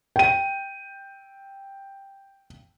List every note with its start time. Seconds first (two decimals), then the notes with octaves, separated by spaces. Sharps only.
0.16 G5 D#7